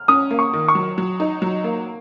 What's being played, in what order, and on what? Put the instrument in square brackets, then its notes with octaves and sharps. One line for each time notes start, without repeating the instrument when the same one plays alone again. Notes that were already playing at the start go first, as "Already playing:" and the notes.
Already playing: [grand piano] F6
[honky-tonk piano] C#4 [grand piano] D#6
[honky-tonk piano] A#3
[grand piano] C#6
[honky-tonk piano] D#3
[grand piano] C#6
[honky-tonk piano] F#3
F#3
D#4
F#3
A#3